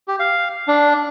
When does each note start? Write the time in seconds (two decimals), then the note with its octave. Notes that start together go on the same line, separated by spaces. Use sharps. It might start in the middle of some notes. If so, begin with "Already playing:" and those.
0.08 G4
0.20 F5
0.68 D4